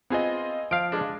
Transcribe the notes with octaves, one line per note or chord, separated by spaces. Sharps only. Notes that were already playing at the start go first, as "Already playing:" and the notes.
B3 C4 F4 G#4 D#5 G#5
F3 F5 D7
G#3 D4